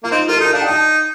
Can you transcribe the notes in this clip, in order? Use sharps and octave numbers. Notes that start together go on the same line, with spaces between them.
A#3 F4
C4 D#4
F4 A#4
A4
D#4 A#4
D4 F5
G5
D#4 A5